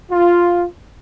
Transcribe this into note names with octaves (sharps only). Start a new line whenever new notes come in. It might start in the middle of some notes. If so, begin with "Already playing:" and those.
F4